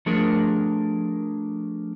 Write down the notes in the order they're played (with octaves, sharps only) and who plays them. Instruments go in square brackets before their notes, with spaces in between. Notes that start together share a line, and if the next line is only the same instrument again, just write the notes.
[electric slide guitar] F3 A3 D4 G#4 A#4